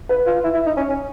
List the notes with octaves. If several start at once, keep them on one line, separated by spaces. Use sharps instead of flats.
B4
F4
E4
E4
D#4
C#4
C#4